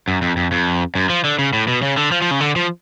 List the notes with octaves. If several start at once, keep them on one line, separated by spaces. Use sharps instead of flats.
F#2
F2
F2
F2
F#2
F3
D3
C#3
A2
B2
C#3
D3
F3
F3
C#3
D3
F3